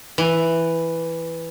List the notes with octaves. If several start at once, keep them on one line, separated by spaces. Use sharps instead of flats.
E3